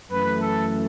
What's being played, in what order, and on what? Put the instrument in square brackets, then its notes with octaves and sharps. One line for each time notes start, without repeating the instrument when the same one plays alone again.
[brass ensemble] F#2 E3 A3 B4
A4